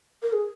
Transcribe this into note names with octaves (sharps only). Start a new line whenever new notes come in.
A#4
G#4